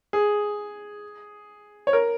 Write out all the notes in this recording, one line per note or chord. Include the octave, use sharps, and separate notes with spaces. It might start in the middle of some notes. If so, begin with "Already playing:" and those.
G#4
C#5
A#4